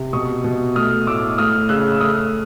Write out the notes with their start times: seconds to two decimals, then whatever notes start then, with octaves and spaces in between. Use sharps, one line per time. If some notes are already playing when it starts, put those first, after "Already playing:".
Already playing: C3
0.13 B2 C#6 D#6
0.44 B2
0.75 A3 D#6 F6
1.07 A2 D6 E6
1.38 A3 D#6 F6
1.69 C#3 E6 F#6
1.92 E6
2.00 A3 D#6 F6